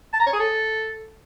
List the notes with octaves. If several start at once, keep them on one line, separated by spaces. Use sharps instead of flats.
A5
A#5
C#5
G#4
A4